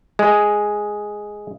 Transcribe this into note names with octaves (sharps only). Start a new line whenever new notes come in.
G#3